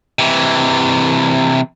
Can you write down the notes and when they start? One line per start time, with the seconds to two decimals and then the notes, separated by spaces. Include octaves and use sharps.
0.19 C3 E3